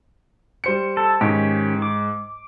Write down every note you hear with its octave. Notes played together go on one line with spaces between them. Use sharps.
G3 C5 C#7
A4
G#2 D#3 C#4 G4
D6